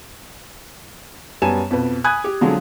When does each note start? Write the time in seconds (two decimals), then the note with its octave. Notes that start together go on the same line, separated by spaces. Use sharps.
1.42 F#2 G3 B3 G#5 A5 E7
1.71 F2 B2 B4
2.04 G#5 B5 D#6 F#6 G#6
2.24 G4
2.41 D3 F3 F#3 G#3 C4